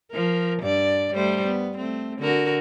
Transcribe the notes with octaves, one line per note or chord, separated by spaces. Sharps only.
F3 A#4
G2 D5
G3 A3 C5
B3
A3 C4
D3 F#4 A#4